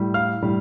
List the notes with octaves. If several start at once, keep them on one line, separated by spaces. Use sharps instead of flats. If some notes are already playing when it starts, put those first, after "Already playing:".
Already playing: A2 G3
F5 F6
A2 G3